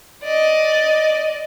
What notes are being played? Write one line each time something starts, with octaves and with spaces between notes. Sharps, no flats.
D5 D#5